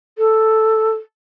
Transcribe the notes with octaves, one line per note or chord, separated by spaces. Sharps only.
A4